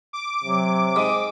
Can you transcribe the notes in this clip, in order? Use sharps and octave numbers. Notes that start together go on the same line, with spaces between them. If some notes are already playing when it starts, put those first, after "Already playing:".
D6
C3 F#3
G#2 D#6